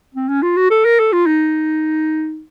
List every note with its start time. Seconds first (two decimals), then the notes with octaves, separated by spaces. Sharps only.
0.15 C4
0.28 C#4
0.43 F4
0.57 F#4
0.70 A4
0.85 A#4
0.99 A4
1.12 F4
1.26 D#4